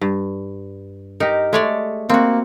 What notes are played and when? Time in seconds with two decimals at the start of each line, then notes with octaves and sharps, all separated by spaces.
0.01 G2
1.20 D#4 G4 A#4
1.53 G#3 A3 C#5 D5
2.09 A#3 C4 F#4